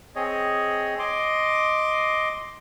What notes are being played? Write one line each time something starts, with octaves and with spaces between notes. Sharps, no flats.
C4 G#4 C#5 D#5
D#5 C6 D6